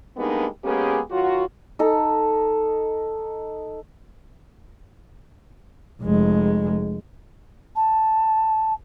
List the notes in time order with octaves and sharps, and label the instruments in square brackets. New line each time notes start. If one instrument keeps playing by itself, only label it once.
[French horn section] G3 G#3 A#3 B3 D4 D#4
G#3 A#3 B3 C#4 G4 G#4
D#3 F#3 F4 F#4
[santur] D#4 A4
[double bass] F1 G#3
[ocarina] A5